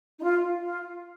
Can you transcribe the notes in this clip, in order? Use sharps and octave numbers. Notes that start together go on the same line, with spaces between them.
D#4
F4
F4